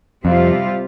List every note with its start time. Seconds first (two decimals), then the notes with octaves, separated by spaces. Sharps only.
0.24 F2 C3 G3 C4 F4